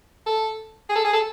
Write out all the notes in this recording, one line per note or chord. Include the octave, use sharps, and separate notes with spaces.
A4
G#4
A4
G#4
A4